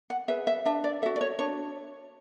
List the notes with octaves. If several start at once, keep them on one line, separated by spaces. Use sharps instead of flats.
F#5
G#4 B4 E5
E5
D4 E5
D5
F#4 A4 E5
D5
C#5
D4 C#5